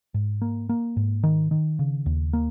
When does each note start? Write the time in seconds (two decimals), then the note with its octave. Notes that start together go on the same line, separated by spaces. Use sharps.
0.14 G#2
0.42 A#3
0.69 A#3
0.97 G#2
1.23 D#3
1.51 D#3
1.79 C#3
2.06 D#2
2.33 A#3